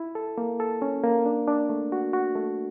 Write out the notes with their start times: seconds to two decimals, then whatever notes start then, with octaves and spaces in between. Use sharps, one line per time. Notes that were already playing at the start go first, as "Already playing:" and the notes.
Already playing: E4
0.15 A4
0.38 A#3
0.60 A4
0.82 C#4
1.04 A#3
1.25 D4
1.48 D4
1.69 A3
1.92 F#4
2.13 F#4
2.36 A3